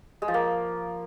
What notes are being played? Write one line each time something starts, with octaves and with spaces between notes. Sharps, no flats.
G#3
F3
A#3